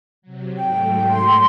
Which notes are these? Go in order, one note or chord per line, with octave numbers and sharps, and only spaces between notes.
C3 F#3
G#2 F#3 A3 G5
C6